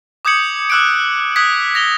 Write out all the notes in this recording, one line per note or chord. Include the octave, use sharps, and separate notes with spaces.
D6 D#6 G6 G#6 C#7 F#7
D6 E6 F#6 C#7 D7
D#6 F#6 G#6 B6
A#6 F7 G7